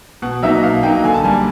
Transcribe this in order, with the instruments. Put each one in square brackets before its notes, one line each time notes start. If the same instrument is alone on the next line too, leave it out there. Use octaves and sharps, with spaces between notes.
[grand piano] B2 F#5
F#3 A#3 D#4 E5
B2 F5
F#3 A#3 D#4 G5
D3 G#5
A5
G3 A#3 G#5